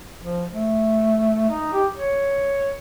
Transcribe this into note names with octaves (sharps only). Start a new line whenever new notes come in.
F3
A3
D#4
G4
C#5